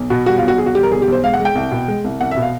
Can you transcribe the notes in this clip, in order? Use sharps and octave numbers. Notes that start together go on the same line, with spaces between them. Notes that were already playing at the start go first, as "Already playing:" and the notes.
Already playing: B1
B2 F#4
G3 F#4
F4
B1
F#4
B1 G#4
F#4
G3 G4
A#4
B1 G#4
G4
B1 C5
G#3 F5
F#5
G#3
G5
C2
B2
G#3
C2
C2 F#5
E5
B2
F5